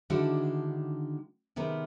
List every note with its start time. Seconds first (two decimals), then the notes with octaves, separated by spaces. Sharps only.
0.10 D3 D#3 G#3 D4 E4 F#4
1.56 C3 D#3 B3 G#4 A#4